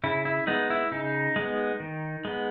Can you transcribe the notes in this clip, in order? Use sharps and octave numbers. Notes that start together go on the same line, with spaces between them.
C#3 E4
E4
G#3 B3 D#4
E4
C#3 D#4
G#3 B3
D#3
G#3 B3